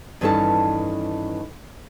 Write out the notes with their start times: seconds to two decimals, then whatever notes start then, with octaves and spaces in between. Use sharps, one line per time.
0.21 G2 D#3 E3 C#4 A4 A5